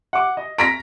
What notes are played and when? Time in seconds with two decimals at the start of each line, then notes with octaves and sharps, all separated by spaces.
0.13 F#5 D6
0.37 D#5
0.58 A#5 A#6 B6 D7